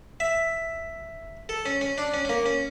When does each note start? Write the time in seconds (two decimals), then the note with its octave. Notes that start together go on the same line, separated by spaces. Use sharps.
0.20 E5
1.49 A4
1.66 C#4
1.81 C#4
1.98 D4
2.14 C#4
2.25 C#4
2.29 A#3
2.46 C#4